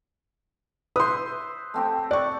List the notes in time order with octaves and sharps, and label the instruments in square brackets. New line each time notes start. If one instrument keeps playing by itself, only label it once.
[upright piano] B4 C6 [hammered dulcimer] C5 E5 [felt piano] D#6
[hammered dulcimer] A3 C4 G4
[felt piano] D5 C#6 [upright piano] F#6